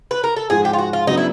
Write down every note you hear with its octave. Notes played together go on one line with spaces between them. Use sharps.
B4
A#4
A4
G#2 F3 G#3 G#4
G4
F4
F#4
F4
C#3 F#3 B3 D4 D#4
E4